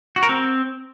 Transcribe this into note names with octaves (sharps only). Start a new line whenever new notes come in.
F#4
A#4
C4